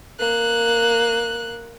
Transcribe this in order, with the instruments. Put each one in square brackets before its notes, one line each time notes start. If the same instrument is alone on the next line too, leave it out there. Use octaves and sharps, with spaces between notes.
[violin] A#3 F#6